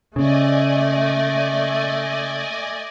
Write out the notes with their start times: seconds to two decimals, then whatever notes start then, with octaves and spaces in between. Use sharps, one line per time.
0.16 C#3 A3 D5 D#5 G#5